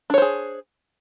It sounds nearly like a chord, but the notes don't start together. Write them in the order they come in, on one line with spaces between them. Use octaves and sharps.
D4 C#5 C5 G#4